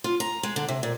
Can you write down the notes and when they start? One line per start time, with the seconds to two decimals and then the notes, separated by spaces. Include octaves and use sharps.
0.04 F4
0.20 A#5
0.43 G#3
0.56 D3
0.69 C3
0.83 A#2